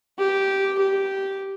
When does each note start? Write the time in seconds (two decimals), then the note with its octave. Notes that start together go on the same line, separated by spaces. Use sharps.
0.19 G4
0.79 G4